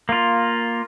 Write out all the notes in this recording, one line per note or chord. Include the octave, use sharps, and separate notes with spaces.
A#3 F4